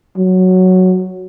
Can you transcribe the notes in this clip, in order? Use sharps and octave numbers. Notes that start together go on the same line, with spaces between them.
F#3